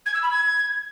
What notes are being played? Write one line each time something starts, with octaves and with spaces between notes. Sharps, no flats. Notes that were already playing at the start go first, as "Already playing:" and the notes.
G#6
E6
B5
G#6